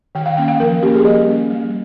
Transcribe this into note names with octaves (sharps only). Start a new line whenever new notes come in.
D#3 G5
F5
A#3 C#4 G5
F5
F3 A#4
A#3 C#4 G4
G#4
G3 D#5
A#3 C#4
G3